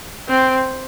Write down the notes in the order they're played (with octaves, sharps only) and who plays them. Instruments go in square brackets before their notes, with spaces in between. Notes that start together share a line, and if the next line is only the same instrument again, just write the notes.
[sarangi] C4